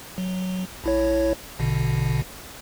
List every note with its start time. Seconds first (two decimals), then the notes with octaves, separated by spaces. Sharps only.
0.18 F#3
0.84 A#1 E4 C#5
1.59 A#1 B2 D3